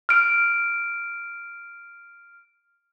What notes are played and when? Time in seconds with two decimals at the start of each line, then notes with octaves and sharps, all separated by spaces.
0.09 F6 D7